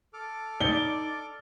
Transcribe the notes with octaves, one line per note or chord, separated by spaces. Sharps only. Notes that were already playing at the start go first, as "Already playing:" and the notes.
A4 D6 F6
D#4 D5 G7